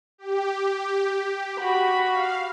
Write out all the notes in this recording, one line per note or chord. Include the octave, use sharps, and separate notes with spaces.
G4
F#4 B5
F5